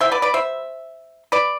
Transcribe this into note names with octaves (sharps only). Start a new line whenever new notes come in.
E3 G3 B3 C5 E5
B4 D5
B4 D5
C5 E5
B4 D5